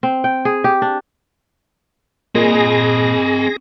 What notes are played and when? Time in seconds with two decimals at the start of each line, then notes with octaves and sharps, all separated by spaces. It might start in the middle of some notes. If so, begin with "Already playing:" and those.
0.03 C4
0.24 G5
0.45 G#4
0.64 G4
0.82 D4
2.35 A#2 C4 G#4 D#5 A#6